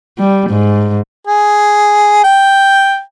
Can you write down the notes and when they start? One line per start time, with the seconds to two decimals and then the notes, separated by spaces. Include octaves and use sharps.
0.19 G3
0.49 G#2
1.27 G#4
2.24 G5